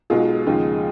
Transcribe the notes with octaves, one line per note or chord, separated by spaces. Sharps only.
B1 B2 G#3 F4 G#4
D#2 C#3 F3 G#3